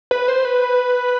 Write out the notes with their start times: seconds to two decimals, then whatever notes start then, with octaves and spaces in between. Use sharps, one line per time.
0.11 B4
0.28 C5
0.45 B4